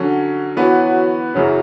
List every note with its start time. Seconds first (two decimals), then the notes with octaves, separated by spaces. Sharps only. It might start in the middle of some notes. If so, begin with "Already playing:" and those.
Already playing: D3 F#3 C#4
0.57 E3 F#3 B3 F#4 B4
1.34 F#2 C#3 E3 F#3